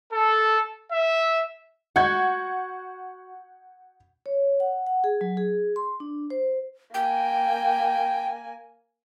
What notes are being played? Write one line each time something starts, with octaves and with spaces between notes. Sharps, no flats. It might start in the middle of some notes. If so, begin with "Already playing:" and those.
A4
E5
F#4 F#5 G6 G#6
C#5
F#5
F#5
G#4
F#3
G#4
C6
D4
C5
A#3 G5 G#5